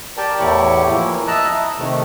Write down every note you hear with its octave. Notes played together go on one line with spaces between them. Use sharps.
G4 A#4 D5 G5 A5
E2 A2 E4 G4 C#6
E3 F3 A#3 E4
D#5 E5 A5 A#5 E6 F#6
E4
C3 D#3 A3